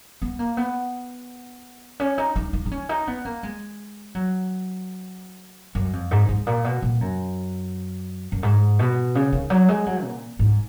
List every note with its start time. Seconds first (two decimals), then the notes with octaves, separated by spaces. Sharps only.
0.22 B3
0.39 A#3
0.57 B3
2.00 C#4
2.18 D#4
2.36 D#4
2.53 D#4
2.66 D#4
2.71 C#4
2.89 D#4
3.07 B3
3.25 A#3
3.43 G#3
4.15 F#3
5.75 F#2
5.93 F2
6.11 G#2
6.29 G#2
6.47 A#2
6.64 B2
6.82 A#2
7.01 F#2
8.32 F#2
8.43 G#2
8.79 B2
9.15 C#3
9.33 D#3
9.50 F#3
9.68 G#3
9.86 F#3
10.04 A#2
10.39 G#2